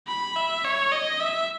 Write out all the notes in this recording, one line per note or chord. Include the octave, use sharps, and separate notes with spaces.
B5
E5
C#5
D#5
E5